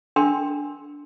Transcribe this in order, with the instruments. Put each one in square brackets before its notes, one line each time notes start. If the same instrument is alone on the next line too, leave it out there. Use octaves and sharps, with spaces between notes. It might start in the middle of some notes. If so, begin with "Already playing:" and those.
[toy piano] D4 A#4 G5 C6